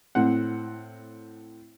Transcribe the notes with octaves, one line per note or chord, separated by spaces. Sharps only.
A2 C4 F#5